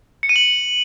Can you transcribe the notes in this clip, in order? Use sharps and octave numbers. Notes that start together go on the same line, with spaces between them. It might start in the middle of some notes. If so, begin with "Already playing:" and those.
C#7
D#7
F#7